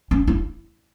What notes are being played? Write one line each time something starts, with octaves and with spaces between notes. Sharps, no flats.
C#4
E4